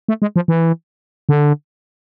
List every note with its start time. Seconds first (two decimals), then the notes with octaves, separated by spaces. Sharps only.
0.08 A3
0.22 G#3
0.36 F3
0.48 E3
1.29 D3